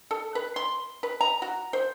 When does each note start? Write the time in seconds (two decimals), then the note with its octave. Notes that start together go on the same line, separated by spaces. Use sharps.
0.11 A4
0.35 B4
0.56 C6
1.03 B4
1.21 A#5
1.42 F#4
1.73 C5